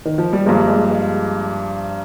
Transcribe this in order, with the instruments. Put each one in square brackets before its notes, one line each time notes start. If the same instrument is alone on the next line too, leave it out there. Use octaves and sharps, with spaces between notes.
[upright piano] D#3
F3
G3
[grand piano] G2 F3 A#3 [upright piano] G#3
[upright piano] G#3
G#3